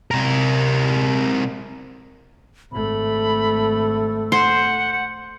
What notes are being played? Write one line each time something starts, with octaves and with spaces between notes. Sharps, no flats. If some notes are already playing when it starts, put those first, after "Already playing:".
C3 A#4
G#1 A3 B5
C5 F#5